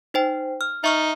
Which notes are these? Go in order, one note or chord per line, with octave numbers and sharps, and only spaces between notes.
D#4 C5 G5
F6
D#4 E5 C#6 F6